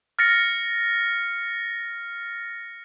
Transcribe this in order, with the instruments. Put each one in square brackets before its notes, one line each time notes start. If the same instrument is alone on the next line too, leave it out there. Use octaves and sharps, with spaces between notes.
[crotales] F6 A6 A#6 C#7